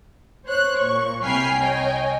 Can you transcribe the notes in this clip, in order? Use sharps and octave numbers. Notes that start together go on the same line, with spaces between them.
C5 C#5 F#6
A#2 C#6
C2 G5 G#5 B5 F6 C7
C#5 D#5 G5 G#5